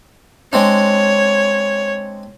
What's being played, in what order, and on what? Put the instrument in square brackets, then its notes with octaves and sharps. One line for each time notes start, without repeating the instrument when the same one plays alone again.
[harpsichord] G#3 C4 D4 [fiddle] C#5